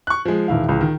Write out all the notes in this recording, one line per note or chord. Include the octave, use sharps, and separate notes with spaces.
C#6 F#6
F3 G#3
E1 D#3 E4 F5
C#2 E3
D#3